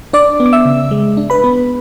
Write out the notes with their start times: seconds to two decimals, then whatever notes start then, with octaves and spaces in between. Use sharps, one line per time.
0.13 D4 D5 D6
0.40 B3
0.46 D6
0.53 E5 E6
0.65 C#3
0.91 G#3
1.17 D4
1.30 B4 B5
1.44 B3